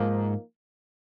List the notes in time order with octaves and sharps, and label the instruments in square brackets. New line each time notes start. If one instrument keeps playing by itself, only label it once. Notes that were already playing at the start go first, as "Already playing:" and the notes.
Already playing: [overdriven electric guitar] G#2 [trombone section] F3 A#3 D#4